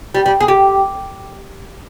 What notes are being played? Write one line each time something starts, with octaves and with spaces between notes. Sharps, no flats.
G3
G3
G#4
G4